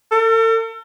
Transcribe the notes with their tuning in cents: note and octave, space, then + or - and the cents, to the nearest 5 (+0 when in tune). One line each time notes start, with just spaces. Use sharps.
A4 +45